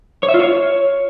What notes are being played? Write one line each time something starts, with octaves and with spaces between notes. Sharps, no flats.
C#5
E5
F4
C#5